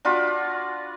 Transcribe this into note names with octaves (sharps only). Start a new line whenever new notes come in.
D4 F4 F#4 B5